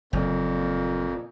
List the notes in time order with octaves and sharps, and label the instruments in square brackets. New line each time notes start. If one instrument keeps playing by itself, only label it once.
[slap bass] F#1 [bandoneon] F2 A#2